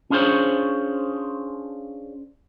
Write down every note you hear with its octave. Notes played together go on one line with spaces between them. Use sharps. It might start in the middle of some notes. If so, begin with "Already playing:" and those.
C#4 D4 F4 G#4 C5 C#5